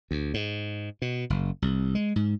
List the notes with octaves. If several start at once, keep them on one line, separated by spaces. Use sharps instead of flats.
D2
G#2
B2
F#1
C2
G#3
G#2